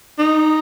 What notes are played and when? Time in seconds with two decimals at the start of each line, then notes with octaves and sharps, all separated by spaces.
0.18 D#4